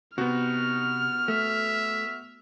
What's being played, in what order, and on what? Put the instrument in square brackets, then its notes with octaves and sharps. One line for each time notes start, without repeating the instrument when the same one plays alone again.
[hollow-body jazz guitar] C3 [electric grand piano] B3 F#4 [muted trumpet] D#4 [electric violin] F6
[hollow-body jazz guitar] A3 [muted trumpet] E5